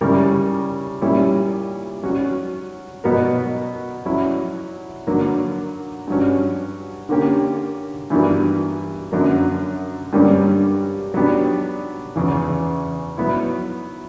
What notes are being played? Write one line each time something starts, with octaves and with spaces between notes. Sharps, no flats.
C#3 G3 C#4 E4 A#4
A#2 G3 C#4 E4
F#3 C#4 F#4
B2 F#3 B3 F#4 A#4
F#3 C#4 E4
D3 F#3 A#3
G2 F#3 C#4
D3 A#3 C#4 G4
G2 E3 B3 F#4 A#4
F#2 D3 F#3 A#3
G2 D3 G3 A#3 C#4
F#3 B3 D4 G4
E2 C#3 E3
F#3 B3 E4